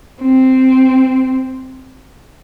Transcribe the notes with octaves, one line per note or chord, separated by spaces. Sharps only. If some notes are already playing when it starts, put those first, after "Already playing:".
C4